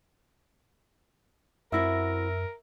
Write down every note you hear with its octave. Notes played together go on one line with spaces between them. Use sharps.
F#2 C4 E4 F#4 A#4 E5 E6 A#6